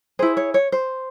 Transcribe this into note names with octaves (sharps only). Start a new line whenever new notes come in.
E4 G#4 C5
C#5
C#5
C5